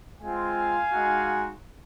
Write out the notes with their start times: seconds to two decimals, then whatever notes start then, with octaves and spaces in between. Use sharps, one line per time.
0.21 G#3 C4 F4 F5 G#5
0.92 G#3 D#4 F#4